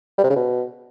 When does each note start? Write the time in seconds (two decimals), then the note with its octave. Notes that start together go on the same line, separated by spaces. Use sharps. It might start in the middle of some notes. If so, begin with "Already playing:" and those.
0.18 G3
0.24 C3
0.30 C#3
0.36 B2